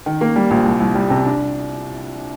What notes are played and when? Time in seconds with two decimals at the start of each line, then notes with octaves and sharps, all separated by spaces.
0.06 D#3
0.21 A#3
0.36 G3
0.51 A#1
0.65 C2
0.80 C2
0.95 G3
1.10 C3
1.25 D4